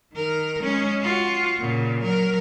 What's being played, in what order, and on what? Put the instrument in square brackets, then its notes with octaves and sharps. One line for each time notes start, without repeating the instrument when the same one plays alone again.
[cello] D#3 A#4
G#3 C#4
F4 F#4
A#2 C#3
F#3 A#4